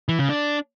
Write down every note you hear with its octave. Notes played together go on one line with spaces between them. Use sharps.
E3
C#3
D4